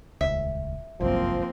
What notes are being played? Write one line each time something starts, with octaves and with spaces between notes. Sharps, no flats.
D#1 C#2 E5
G1 C2 F#2 F3 A#3 C4